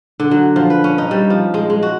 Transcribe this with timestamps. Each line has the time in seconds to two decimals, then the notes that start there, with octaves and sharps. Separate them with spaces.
0.20 D3
0.31 F#3
0.56 F3
0.70 B4
0.84 C#4
0.98 D#4
1.11 G3
1.30 F3
1.54 G#3
1.70 G#3
1.83 F#4